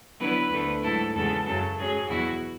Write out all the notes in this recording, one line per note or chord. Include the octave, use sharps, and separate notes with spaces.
D3 F#3 B3 E4 B4
D2 D3 A3
G#2 F#3 A3 E4 A4
E2 C#3 G#3 B3 A4
F#2 C#3 F#3 A4
G#2 F#3 C#4 G#4
E2 B2 F#3 B3 E4 F#4